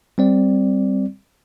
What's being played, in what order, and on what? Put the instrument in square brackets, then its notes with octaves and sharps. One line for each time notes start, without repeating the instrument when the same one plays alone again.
[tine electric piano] G3 C4 D5